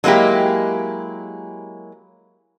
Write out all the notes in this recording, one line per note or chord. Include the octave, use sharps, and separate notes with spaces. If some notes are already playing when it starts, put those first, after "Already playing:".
F#3 G#3 A#3 E4 G4